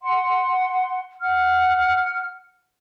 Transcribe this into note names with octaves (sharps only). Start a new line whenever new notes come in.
F#5 C6
F#5 F6